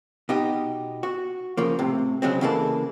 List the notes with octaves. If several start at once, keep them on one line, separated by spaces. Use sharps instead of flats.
B2 D#4 G4
F#4
C#3 F3 A#3
A2 C3
C#3 F#3 G#3 C4
C#3 E3 G#3 A#3 A4